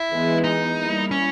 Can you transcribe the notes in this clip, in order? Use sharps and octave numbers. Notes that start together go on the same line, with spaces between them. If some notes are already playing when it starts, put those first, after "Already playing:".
Already playing: E4
E3 G#3 B3
D#4
G3 A#3 E4
C#4